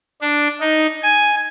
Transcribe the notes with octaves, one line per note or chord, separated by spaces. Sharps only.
D4
D#4
G#5